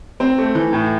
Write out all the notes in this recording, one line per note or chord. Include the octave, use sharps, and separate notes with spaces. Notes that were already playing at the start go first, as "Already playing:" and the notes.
C4
A3
E3
A2